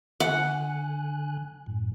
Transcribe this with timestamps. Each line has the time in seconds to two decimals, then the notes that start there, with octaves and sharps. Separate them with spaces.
0.20 D3 F#5 G#5 F#6
1.66 F#2 A2